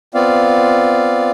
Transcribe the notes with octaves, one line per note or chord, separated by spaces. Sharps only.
B3 C4 F4 D5 F5